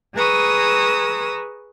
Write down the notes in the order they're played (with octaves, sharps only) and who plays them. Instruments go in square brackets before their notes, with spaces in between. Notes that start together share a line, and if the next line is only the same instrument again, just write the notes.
[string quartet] G#4 B4 A#5 C#6 D#6 E6